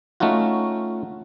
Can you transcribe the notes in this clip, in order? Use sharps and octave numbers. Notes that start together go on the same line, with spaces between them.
A3 C#4 D#4 F4 F#4